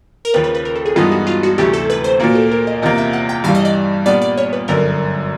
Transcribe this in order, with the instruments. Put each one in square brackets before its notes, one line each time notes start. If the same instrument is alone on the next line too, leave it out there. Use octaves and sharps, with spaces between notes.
[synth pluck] A#4
[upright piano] D#2 C#3 F3 [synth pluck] B4
[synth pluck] B4
B4
A#4
A4
G#4
[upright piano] G2 E3 G#3 B3 D#4 [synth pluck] F4
[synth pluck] F#4
F4
F#4
[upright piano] D2 C3 E3 A3 [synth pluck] G4
[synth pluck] A4
B4
C5
[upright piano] A#2 F3 A#3 [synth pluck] F#4
[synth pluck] A4
A#4
D#5
[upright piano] E2 C3 F3 A#3 [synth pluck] D#5
[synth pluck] E5
F#5
G5
[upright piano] G2 E3 G3 [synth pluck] F5
[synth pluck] D#5
D5
[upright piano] A#2 G3 B3 D4 [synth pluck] D5
[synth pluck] D5
C#5
B4
[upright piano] G1 F#2 D3 [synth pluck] A#4